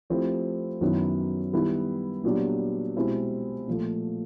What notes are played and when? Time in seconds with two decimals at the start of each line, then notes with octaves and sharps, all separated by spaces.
0.10 F3 A3 C4 E4 G4
0.81 F#2 D#3 F#3 B3 E4
1.53 D#3 G3 B3 E4
2.24 A#2 F#3 B3 D4 G4
2.96 B2 G#3 C4 E4 G4
3.68 A#2 F3 A3